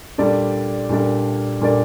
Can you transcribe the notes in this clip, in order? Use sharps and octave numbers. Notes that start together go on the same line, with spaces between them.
A#2 G3 D4 A4 D5
A#2 G3 D4 A4 D5
A#2 G3 D4 A4 D5